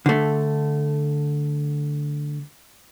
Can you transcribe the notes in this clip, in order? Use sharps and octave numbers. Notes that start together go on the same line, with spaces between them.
D3 A3